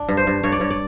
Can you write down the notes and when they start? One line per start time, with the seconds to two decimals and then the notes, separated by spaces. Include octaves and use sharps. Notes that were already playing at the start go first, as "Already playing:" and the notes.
Already playing: D4
0.09 G2
0.17 C5
0.27 G2
0.43 G2 C#5
0.52 D5
0.60 G2 C#5
0.70 D5